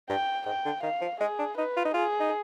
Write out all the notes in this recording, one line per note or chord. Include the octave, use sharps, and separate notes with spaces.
G2 G5
G#2 G5
D3
D#3 F5
F3
G#3 G#4
D4
D#4 B4
F4
D#4
F4 G#4
D#4